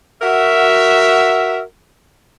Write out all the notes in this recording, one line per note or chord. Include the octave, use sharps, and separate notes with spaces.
F#4 A#4 E5